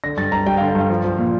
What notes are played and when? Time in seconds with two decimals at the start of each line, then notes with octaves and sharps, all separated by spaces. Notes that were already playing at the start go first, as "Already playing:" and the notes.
0.04 D3 A#6
0.17 G2 A6
0.32 G2 A#5
0.46 G3 G5
0.57 F5
0.61 D3
0.68 G5
0.75 G2 F5
0.90 F3
1.04 F3
1.18 A#2